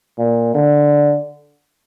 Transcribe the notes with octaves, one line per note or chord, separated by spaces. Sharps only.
A#2
D3